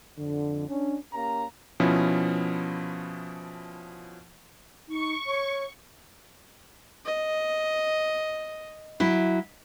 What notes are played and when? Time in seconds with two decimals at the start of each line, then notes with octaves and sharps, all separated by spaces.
0.17 F2 D3
0.68 C#4 D4
1.14 A#3 C#4 G4 A#4 F5 A#5
1.80 B2 F3 C#4 E4
4.89 D#4 C#6
5.26 C#5
7.05 D#5
9.00 F#3 E4